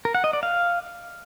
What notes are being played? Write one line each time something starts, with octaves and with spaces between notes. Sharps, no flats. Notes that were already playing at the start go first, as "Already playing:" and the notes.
A#4
F#5
D#5
D5
F5